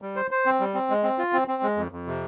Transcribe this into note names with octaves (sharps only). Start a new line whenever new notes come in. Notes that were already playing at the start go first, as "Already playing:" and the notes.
G3
C5
C5
C4
G3
C4
G#3
C4
F4
C4
C4
G#3
F2
F2
C3